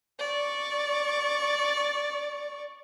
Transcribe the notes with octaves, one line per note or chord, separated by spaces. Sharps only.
D5 C#6